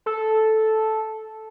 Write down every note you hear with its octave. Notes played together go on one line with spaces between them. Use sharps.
A4